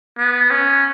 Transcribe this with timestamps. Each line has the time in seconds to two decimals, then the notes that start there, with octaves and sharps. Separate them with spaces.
0.18 B3
0.51 C#4